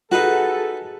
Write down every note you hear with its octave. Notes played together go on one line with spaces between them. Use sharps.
D#4 F#4 G#4 A4 B4 F#5